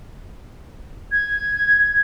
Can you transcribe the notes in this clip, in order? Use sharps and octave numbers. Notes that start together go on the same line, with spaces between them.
G#6